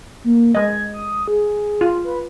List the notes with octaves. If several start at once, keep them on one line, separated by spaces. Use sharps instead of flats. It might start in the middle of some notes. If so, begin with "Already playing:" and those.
A#3
G#3 D#5 G#6
D#6
G#4
F4
B4